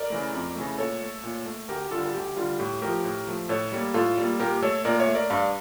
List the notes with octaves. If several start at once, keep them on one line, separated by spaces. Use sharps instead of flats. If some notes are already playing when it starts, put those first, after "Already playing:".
Already playing: A#4 D5
C#3 E3 A3
F2
C#3 E3 A3
A#2 A4 C#5
A3
A#2
A3
D2 G4 A#4
D3 G3 F4 A4
A4
D2 G4
D3 G3 F4
A2 G4
F3 A3 G4 A#4
A2
F3 A3
A2 A4 C#5
G3 A#3
A2 F4 A4
G3 A#3
A#2 G4 A#4
A3 A4 C#5
A#2 A#4 D5
C#5 E5
A3
A#4 D5
G2 D5 F5